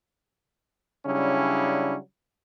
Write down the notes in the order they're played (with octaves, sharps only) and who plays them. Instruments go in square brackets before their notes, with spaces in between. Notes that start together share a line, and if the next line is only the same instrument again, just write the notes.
[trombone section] C#3 F#3 G3 C#4 D4 E4